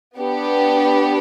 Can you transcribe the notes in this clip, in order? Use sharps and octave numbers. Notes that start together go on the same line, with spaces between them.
B3 D4 G4